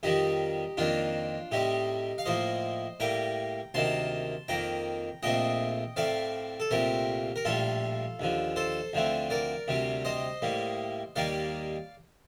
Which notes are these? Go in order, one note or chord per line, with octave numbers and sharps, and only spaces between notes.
F2 D#3 G3 D#4 G4
F2 D#3 A#3 D4 F4
A2 G3 C4 D#4 G4
F5
A2 F3 A#3 C5 D#5
A2 G3 A#3 G5 A#5
D2 C3 D#3 A#3 A5 C6
F2 D#3 A#3 G5 A#5
A#1 A#2 A3 C4 D#5 G5
A2 A3 C4 D5 F5
A4
C2 A#2 A3 C4 G4 A#4
A#4
A#1 A2 G3 F4 A4
D#2 D3 F3
A4 C5
D2 D3 F3 A3 C4
A#4 D5
D2 C3 G3 C4
C5 D#5
A2 G3 A#3
D#2 D#3 G3 A#3 D5 F5